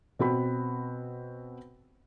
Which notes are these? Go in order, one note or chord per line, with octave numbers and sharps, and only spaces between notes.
B2 C4 F#4 B5